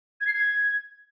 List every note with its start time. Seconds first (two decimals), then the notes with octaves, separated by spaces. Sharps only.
0.21 G#6
0.27 C7
0.33 G#6